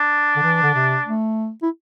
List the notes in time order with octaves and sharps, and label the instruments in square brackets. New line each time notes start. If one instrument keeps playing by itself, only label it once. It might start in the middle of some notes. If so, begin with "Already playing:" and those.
Already playing: [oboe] D4
[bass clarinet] D3
E3
D3
C3
A3
E4